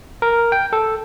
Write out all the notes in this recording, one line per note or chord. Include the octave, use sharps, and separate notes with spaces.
A#4
G5
A4